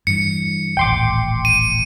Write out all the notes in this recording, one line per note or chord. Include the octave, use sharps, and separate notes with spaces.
G2 E3 C#7
D#1 A1 G5 C6 D6
D#7